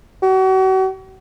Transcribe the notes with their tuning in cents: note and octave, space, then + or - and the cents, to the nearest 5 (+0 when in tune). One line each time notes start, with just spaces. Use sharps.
F#4 +40